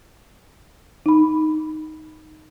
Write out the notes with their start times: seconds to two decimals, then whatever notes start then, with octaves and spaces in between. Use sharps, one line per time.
1.06 D#4 B5